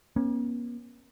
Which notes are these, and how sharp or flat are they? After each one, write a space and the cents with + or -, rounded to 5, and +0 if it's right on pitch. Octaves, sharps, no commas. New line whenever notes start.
A#3 +45 C#4 -30